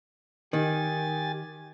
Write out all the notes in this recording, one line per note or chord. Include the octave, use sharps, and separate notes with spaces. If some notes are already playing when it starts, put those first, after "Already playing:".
D#3 G4 G#5 A6